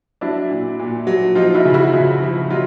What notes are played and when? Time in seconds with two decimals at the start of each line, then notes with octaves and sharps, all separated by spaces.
0.21 F#3 D4 E4
0.50 A#2
0.79 A#2
1.07 F#3
1.35 F3 D#4 F4
1.54 E4 F#4
1.65 C#3
1.74 E4 F#4
1.93 C#3
2.22 F3
2.50 F#3 D#4 F4